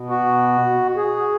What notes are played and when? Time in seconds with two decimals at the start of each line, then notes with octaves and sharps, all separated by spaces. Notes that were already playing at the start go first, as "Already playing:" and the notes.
Already playing: B2
0.09 F#4
0.97 G#4